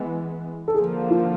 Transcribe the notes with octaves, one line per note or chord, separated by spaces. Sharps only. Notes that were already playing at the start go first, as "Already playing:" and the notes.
Already playing: E3 G#3 B3
A4
D3 F3 A#3 G#4
F4